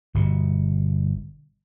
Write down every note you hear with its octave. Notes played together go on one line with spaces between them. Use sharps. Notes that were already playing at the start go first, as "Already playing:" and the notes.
G1 B2